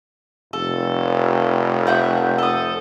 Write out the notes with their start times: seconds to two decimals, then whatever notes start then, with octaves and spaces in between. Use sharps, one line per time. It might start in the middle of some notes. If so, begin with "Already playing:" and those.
0.53 F1 A4
1.87 E5 F#5 G6
2.38 A4 D#6